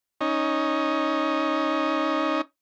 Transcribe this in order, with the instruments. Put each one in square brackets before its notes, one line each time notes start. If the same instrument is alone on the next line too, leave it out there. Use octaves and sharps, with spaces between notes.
[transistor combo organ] C#4 D#4